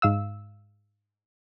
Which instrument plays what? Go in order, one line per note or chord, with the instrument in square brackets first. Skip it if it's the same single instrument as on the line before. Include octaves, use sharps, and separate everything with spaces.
[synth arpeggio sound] G#2 F5 E6